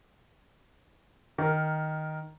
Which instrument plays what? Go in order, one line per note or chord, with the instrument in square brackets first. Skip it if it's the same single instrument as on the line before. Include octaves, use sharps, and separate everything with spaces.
[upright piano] D#3 A#4